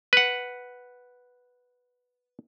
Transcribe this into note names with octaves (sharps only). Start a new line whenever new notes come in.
B4 F#5